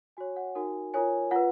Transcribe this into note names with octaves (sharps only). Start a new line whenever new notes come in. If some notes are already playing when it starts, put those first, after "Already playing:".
F#4 C#5 G#5
F#5
D#4 F#4 A#4 G#5
F4 A#4 C#5 G#5
F4 B4 F#5